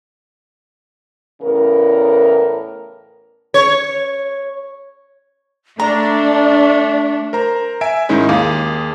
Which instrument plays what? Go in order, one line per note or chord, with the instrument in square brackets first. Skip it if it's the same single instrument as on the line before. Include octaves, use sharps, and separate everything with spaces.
[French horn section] E2 A2 C#3 A#4
[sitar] C#5
[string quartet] A3 [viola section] D4 [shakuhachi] D5 [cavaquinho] A#5
[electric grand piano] A#4 C5 A#5
E5 G#5 D7
G#2 D#3 G#3 C#4 D#4 E4
D#2 G#4 F5 D6